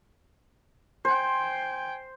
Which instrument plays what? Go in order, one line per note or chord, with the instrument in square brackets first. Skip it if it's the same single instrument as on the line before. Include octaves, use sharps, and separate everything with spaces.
[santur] C5 [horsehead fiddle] G5 G#5